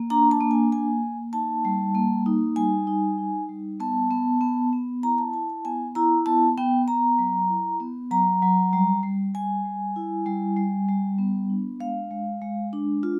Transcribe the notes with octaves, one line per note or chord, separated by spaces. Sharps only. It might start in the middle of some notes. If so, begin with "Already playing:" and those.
Already playing: A#3
D4 A#5
A5
A#3
G#5
A#3 G#5
A#3
D#4 A5
G3
A#3
D#4
G3 G#5
D#4
D#4
G3
B3 A5
B3
B3
B3
E4 A#5
A5
E4 A5
A5
B3 G#5
E4 A#5
B3 A5
B3 G5
B3 A#5
F#3
E4
B3
F#3 A#5
F#3
G3
G3
G3 G#5
G3
E4
G3
G3
G3
B3
D4
G#3 F5
G#3
G#3
D4
F4